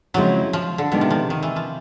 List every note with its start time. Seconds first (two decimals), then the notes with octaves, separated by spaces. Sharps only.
0.14 C#3 F3 F#3 G#3 C4 E4
0.53 F3
0.78 D3
0.92 B2 D#3 G#3 B3 D4
1.01 C3
1.10 F3
1.30 D#3
1.43 E3
1.56 F3